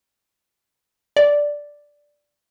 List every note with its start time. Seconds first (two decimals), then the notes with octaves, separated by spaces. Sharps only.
1.17 D5